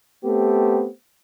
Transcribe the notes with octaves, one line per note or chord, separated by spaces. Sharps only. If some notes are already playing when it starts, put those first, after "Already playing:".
A3 B3 C4 G4